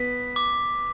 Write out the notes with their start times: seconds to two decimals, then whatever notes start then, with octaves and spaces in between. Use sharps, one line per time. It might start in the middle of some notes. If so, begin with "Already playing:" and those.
Already playing: B3 B6
0.36 D6